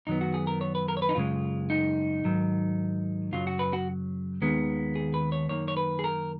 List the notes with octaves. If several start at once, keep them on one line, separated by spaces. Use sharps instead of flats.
F#2 D#3 F#3 B3 D#4
F#4
G#4
A#4
C#5
B4
A#4
C#5
B4
D#4
F#2 C#3 G#3 F4
D#4
G#2 D#3 F#3
F#2 C#3 F#3 F4
F#4
B4
F#4
D#2 D#3 G#3 B3
G#4
B4
C#5
F#2 D#3 A#3 C#5
C#5
B4
G#4
A#4